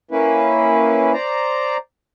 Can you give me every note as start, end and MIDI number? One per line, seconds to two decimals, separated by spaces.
0.11 1.13 58
0.11 1.13 61
0.11 1.13 64
0.11 1.13 71
1.13 1.77 72
1.13 1.77 74
1.13 1.77 82